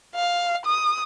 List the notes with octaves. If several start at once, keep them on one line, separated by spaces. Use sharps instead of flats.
F5
D#6